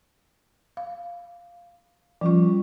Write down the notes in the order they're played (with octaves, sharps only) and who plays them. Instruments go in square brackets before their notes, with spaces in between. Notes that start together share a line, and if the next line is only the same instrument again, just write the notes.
[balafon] F5
[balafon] F3 C#6 [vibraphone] G3 C#4 F4